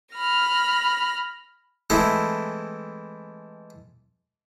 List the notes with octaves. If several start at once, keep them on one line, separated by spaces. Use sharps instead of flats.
B5 F6 A#6
E3 G#3 A3 C4 E4